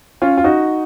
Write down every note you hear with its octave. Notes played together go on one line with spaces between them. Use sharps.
C#4 F4
F4
D#4 F#4